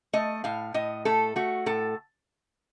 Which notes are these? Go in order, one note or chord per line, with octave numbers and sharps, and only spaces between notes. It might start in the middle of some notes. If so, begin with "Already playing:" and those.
A3 D#5
A2 F5
A2 D#5
A3 A4
A3 F#4
A2 A4